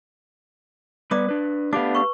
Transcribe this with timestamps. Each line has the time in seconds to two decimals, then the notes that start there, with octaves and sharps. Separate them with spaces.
1.11 G3 B3 B4 D5 D6 D#6
1.29 D4 B4
1.73 A3 B3 D4 G4 F5 D6
1.95 B4 C#6